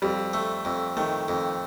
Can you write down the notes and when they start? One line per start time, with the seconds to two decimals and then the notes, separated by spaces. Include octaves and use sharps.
0.02 F2 G3
0.33 A3
0.65 F2
0.97 D#3 A3
1.28 F2